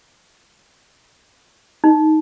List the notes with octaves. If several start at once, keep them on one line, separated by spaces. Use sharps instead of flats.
D#4